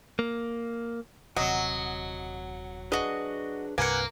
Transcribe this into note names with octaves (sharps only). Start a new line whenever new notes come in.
A#3
D#1 C3 F#3 D#5 F#5
D4 F#4 G#4 B4 D#5
C2 G2 C3 A#3 B4 F#5 G#5